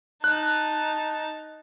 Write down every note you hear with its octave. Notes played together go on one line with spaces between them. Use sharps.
D#4 A5 F#6